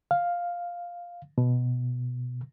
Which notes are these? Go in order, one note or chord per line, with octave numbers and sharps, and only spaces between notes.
F5
B2